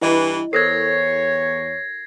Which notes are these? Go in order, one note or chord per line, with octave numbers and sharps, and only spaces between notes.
G2 E3 E4 D#5 E5
E2 A4 A#4 C5 C#5 G#6 A#6 C7